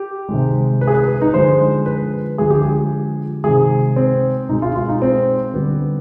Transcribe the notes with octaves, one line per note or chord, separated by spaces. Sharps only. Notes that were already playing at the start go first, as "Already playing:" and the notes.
Already playing: G4
C3 D#3 G#3
B4
G#4
B4
B4
D#4
D3 F3 G#3 C5
B4
D3 F3 G#3 G#4
G4
G#4
C3 D#3 G#3 G#4
C4
B2 G#3 D#4
F4
F4
D#4
C4
D3 G3 B3